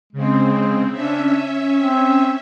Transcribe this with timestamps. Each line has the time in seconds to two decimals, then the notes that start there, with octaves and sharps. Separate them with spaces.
0.13 C#3 G#3 C4
0.92 C#4 D4 E5
1.76 C4